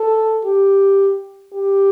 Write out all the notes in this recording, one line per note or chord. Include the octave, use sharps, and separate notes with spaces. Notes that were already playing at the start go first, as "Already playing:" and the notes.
Already playing: A4
G4
G4